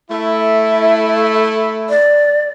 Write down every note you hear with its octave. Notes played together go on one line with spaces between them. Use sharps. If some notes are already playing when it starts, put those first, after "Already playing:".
A3 E4 E5
D5